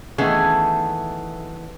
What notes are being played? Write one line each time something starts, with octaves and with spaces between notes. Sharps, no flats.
D#3 E3 A3 B3 C#4 G#4